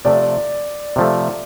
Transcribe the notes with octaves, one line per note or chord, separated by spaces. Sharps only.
C3 F3 A3 D5
C3 F3 A3